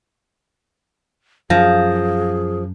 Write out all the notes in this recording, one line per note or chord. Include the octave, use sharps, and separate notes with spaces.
F#2 F3 G#4 F5 A#6